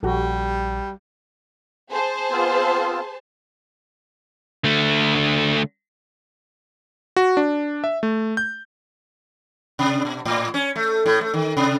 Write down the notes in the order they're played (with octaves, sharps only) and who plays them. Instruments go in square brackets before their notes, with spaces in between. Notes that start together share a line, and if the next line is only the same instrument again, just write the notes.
[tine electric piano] A#1 [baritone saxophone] G3 [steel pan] F#4 G4 A4
[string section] G#4 C5 A5
[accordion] B3 C4 F4
[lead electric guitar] D3 A3
[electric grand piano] F#4
D4
E5
A3
G6
[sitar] C3
B2
A2
C#4
A3
A2
A3
D#3
C3